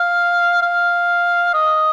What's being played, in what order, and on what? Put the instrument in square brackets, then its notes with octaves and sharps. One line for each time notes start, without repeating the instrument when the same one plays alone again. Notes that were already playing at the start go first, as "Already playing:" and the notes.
Already playing: [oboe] F5
F5
D#5